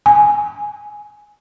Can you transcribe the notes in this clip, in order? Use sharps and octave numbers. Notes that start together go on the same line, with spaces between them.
G#5